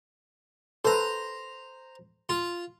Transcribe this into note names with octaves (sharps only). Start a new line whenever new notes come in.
A4 B4 C5 A#5
F4